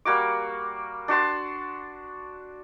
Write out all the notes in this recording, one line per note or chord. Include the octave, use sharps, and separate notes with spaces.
G3 A#3 F#4 D6
D4 F#4 A5 C6